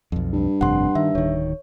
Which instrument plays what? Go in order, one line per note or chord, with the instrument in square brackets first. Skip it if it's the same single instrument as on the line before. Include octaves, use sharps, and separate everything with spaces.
[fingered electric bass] B1 F2
[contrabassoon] G2
[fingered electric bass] G1 F2 C3 [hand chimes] F#5 C6
[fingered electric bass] D#3 [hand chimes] E5
[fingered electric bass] D1 D#3 [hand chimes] C#5